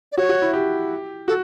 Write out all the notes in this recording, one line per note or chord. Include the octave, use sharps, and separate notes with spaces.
D5
F#4 C#5
F#4
E4
G4
F#4 A4